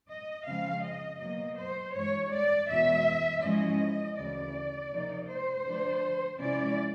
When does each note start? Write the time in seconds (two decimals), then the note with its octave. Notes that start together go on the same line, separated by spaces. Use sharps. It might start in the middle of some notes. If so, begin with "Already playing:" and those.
0.09 D#5
0.46 C#3 F3 G#3 C4 F5
0.83 D#5
1.20 B2 F#3 A#3 D#5
1.57 C5
1.95 G2 E3 G#3 C#5
2.32 D5
2.68 E2 B2 G#3 E5
3.42 G#2 F3 G#3 C#4 E4 D#5
4.17 D2 C#3 E3 D5
4.91 C3 F3 A#3 D#4
5.28 C5
5.65 D3 F3 A3 D4
6.39 C3 F3 G#3 C#4 E4 D5